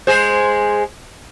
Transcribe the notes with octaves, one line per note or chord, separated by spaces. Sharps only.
G#3 G#4 C5